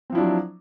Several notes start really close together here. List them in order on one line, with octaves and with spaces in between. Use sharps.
C4 F3 E4 D4 F#3